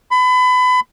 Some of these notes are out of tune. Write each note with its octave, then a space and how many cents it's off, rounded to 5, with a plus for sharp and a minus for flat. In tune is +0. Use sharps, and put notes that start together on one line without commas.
B5 +30